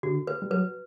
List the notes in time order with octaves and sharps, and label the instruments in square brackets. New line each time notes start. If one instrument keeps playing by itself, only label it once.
[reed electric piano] D3 [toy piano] F#4
[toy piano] B4
[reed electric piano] G3
[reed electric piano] F#3 [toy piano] B4